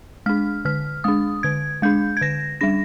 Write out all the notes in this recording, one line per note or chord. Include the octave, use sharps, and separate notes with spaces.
G#3 D4 F6
D3 F6
G#3 D4 D#6
D3 G#6
G#3 D4 G6
G#6
D3 A#6
G3 D4 A#6